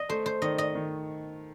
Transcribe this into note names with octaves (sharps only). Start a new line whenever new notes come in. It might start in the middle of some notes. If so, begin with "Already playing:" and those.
Already playing: D#5
A3 C5
C5
D#3 D#5
D#5
D#3